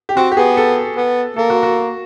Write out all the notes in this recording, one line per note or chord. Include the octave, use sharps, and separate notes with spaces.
G4
C4 F#4
G4
B3 G#4
A4
B3
A#3 A4
F#4
F#4